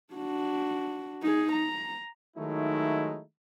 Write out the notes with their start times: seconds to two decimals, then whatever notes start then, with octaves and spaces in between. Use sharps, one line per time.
0.14 D4 F#4
1.22 D#4 G#4
1.53 A#5
2.36 D#3 F#3 G#3 A3 D#4 E4